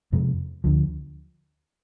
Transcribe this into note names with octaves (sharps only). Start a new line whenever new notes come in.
F2 C3 F3 G#3
D2 D3 F3